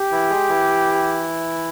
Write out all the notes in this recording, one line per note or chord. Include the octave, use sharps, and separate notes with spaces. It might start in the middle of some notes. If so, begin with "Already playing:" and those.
Already playing: G4
E3 E4
G#3 G#4
E3 E4